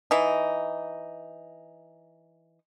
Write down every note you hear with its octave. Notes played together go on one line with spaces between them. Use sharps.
E3 D#4